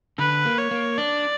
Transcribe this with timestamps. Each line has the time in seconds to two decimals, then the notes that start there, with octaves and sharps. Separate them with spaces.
0.19 D3 B4
0.45 A#3
0.59 C#5
0.71 A#3
0.98 D4 D5